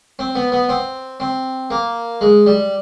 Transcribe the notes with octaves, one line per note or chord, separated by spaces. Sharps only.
C4
B3
B3
C4
C4
A#3
G#3
G3